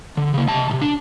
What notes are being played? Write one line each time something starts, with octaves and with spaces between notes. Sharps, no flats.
D3
C#3 A#3
C3 A5
C2 C3
D4